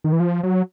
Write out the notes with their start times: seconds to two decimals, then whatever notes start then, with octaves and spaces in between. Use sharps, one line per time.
0.04 D#3
0.13 E3
0.20 F3
0.43 F#3